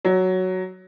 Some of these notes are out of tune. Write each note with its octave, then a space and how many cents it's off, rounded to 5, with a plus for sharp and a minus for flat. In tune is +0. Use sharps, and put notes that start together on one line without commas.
F#3 +5